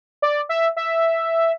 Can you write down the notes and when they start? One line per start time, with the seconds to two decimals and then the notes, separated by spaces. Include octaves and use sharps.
0.22 D5
0.49 E5
0.77 E5